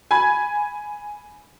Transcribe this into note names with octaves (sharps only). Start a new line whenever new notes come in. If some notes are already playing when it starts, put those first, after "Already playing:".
G#5 B5 G#6